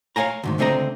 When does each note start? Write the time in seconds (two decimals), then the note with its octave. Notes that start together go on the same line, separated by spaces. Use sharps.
0.16 C#5 D5 F5 G#5 A#5
0.43 D2 G#2 D#3
0.58 C#2 D3 A3 C4 D#5 A#5